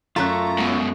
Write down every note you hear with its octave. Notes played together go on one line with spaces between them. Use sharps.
F#2 A3 F4 A4 A#5 F#6
G#2 B2